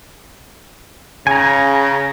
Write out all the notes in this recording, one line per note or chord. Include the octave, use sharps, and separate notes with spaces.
C#3 G#5 A#5